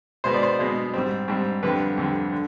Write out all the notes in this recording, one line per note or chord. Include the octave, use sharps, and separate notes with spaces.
B2 G#3 B3 C5
D5
C5
B2 G#3 B3
G#2 G3 C4
G#2 G3 C4
F2 D3 G3 B4
F2 D3 G3
D3